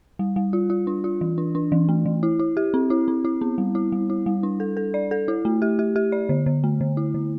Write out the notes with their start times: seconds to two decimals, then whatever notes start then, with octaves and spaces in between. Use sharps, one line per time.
0.19 G3
0.36 G3
0.53 F4
0.70 F4
0.87 D4
1.04 F4
1.21 E3
1.38 D4
1.55 D4
1.72 E3
1.89 A3
2.05 E3
2.23 E4
2.39 E4
2.57 G4
2.74 C4
2.90 E4
3.08 C4
3.25 E4
3.41 B3
3.58 G3
3.75 E4
3.92 G3
4.10 E4
4.26 G3
4.43 D4
4.60 A4
4.77 A4
4.94 D5
5.11 A4
5.28 E4
5.45 A3
5.62 G4
5.79 G4
5.96 G4
6.12 D5
6.29 D3
6.46 D3
6.64 A3
6.81 D3
6.97 E4
7.14 D3